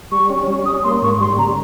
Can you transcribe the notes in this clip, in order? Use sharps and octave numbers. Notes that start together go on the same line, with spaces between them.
G3 C#6
C#4
G3
C#4 D#6
A#3 C6
G#2 C#6
G3 C6
C#3 A#5